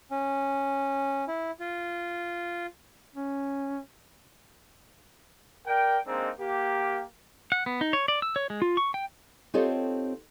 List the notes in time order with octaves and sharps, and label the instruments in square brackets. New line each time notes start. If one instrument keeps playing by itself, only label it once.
[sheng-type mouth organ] C#4
E4
F4
[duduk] C#4
[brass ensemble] A#4 D5 G5
G#3 A#3 C4 D4 D#4
A#3 G4
[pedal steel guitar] F#5
B3
D#4
C#5
D5
E6
C#5
G#3
F4
C#6
G5
[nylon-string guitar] C4 D#4 F4 G4 A4 C#5